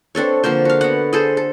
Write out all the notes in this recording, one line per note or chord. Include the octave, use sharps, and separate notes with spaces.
C4 D4 A4 C#5
D3 F3 A#3 C5
F#4 F5
B3 F#4 F#5
G#4 A4 C5
A4